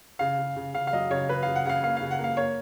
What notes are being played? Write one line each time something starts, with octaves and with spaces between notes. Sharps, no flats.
C#3 F5
C#3
C#3
C#3 F5
F5
F#3 D#5
C#3 C#5
C#3 B4
F5
C#3
F#5
C#3 F5 F#5
A#3 F5
C#3 F5
F#5
A#3
F5
A#3 C#5